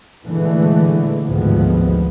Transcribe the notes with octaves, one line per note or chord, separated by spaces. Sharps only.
A#2 D3 E3 G#3 A3
G#1 D2 C3 F3 G#3 B3